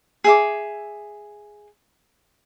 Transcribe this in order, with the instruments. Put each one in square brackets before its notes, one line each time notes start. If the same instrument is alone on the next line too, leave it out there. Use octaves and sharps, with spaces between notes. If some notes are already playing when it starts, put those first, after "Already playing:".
[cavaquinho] G#4 E5 D6